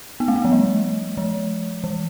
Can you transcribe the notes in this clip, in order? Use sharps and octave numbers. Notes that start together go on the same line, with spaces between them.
B3
A3
B3
F3
G3
F3
E3